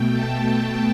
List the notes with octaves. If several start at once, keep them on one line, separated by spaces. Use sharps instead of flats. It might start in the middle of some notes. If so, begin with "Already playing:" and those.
Already playing: B2 A3 G5
A5
G5